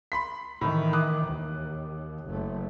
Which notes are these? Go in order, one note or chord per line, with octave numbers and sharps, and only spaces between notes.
B5 C6 B6
A2 D#3 E3
D6 D#6 F#6
D#2
F#1 A3